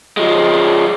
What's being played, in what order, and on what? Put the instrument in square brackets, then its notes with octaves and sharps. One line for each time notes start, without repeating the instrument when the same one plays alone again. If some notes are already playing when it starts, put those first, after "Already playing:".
[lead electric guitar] F3 G#3